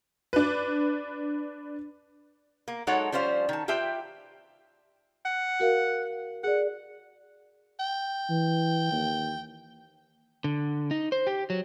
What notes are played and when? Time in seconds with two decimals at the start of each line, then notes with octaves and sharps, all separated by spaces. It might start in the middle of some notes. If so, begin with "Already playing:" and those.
0.33 D4 B4
2.68 A#3
2.87 F#3 G#3 D#4 A4 C#5 F#5
3.12 F3 G3 C#4 C5 F5
3.49 D#3 A5
3.68 F4 G4 B4 E5 G5
5.25 F#5
5.60 F#4 A#4 F5
6.44 G#4 D5 F#5
7.80 G5
8.30 E3
8.92 D#2
10.44 D3
10.91 D#4
11.12 C5
11.27 G4
11.50 F#3